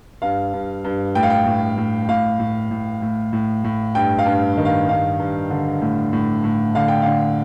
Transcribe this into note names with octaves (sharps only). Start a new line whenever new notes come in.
G2 F5
G2
G2
A2 G5
F5
G5
A2
A2
A2 F5
A2
A2
A2
A2
A2
G2 G5
F5
G2
D#3
F5
G2 F5
G2
D3
A2
A2
A2
D3 F5
G5
D3 F5